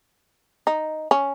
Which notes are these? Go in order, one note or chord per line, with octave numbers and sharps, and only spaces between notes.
D#4
C#4